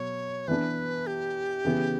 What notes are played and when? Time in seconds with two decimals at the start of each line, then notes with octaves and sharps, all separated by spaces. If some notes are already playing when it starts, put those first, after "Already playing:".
Already playing: B2 F#3 C#5
0.48 E3 B3 D4 B4
1.07 G4
1.65 C#3 E3 B3